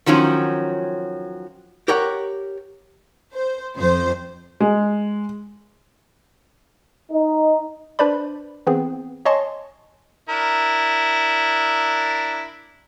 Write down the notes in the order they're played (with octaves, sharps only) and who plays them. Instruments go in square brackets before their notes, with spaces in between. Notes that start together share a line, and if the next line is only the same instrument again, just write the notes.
[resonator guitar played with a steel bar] D#3 F3 F#3 C#4
[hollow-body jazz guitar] G4 A#4 C#5 F#5
[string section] C5
F2 C5
[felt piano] G#3
[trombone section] D#4
[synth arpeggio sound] D4 B4 C5 D5 B5
E3 B3 C4 G#4
C#5 D#5 G#5 A5 C6 C#6
[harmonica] D4 E4 A#4